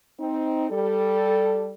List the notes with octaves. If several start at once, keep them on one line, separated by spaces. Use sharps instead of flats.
C4 D#4
G3 A4